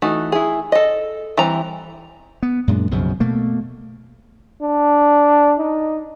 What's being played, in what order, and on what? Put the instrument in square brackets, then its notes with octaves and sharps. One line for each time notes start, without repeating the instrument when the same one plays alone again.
[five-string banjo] E3 A3 D#4 F#4
E4 G#4
A4 D#5
E3 G3 C4 A#5
[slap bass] B3
F#2 A#2 G#3 D4
B1 F#2 C#3 F3
B2 A3 A#3
[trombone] D4
D#4